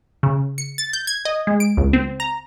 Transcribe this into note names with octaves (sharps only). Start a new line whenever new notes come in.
C#3
C#7
A6
G6
G#6
D#5
G#3
D7
C#2
C4
A#5